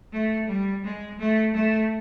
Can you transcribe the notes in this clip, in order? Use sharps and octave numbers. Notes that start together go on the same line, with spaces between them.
A3
G3
G#3
A3
A3